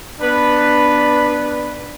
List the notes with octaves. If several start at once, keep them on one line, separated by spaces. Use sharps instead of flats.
B3 D4 B4